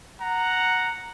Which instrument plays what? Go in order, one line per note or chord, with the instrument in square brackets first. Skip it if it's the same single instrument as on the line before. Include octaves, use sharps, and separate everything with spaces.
[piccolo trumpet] F#5 [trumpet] A#5